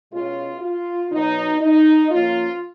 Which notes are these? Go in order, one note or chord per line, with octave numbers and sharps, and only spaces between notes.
B2 G#3 C#4 F4
F4
B2 F#3 B3 D#4
D#4
F3 A#3 C#4 F4